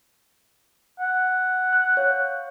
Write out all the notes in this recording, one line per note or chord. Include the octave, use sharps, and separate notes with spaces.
F#5
F#6
C#5 F5